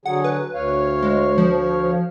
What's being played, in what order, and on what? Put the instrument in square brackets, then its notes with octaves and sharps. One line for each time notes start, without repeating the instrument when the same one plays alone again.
[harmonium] D3 F#3 G#4 [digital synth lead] F#5
[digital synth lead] B4
[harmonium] D2 C#5 F5
[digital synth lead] G#3
F3